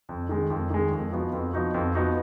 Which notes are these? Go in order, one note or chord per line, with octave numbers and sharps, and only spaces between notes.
F2
D#3 G#3
F2
D#3 G#3
F2
F3 B3 D#4 F#4
F2
F3 B3 D#4 F#4
F2
F3 B3 D#4 F#4